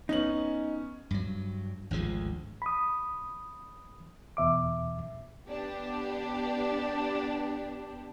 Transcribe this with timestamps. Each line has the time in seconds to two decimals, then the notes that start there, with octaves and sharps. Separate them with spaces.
0.09 B3 C#4 D#4 F#7
1.11 G2 F#3
1.91 G#1 D2 F3 G#3
2.62 B5 D#6
4.37 E2 B2 E5 D6
5.48 B3 D4 G4